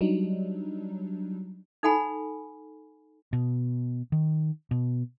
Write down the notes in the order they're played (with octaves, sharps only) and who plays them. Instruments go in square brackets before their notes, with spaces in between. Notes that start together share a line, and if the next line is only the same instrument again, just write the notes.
[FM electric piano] F#3 G3 D4 D#4
[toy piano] D#4 A4 F#5 G#5 B5
[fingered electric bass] B2
D#3
B2